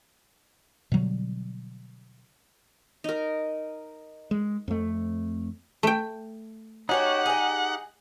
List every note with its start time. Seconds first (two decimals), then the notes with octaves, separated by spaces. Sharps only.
0.92 B2 D3 F#3 G3
3.04 D#4 A#4
4.31 G#3
4.68 F2 A3
5.83 A3 G5
6.89 C#4 D#4 F#4 G4 C#5 F#5
7.26 G#4 D#5